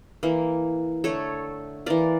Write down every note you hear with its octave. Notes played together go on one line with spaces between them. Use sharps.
E3 A#3
D3 A3 A4 C#5
E3 A#3 A#4 D5